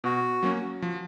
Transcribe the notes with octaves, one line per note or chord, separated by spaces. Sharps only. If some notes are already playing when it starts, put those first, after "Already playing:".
B2 F#4
F#3 A#3 C#4
F3